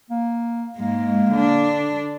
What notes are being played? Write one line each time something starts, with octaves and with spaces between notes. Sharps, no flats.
A#3
G#2 G#3 A#3
D3 D4